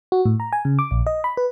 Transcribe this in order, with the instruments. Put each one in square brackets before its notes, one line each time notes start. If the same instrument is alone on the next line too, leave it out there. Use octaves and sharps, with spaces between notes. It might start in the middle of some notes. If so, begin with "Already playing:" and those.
[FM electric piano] F#4
A2
A#5
G#5
C#3
D6
A#1
D#5
B5
B4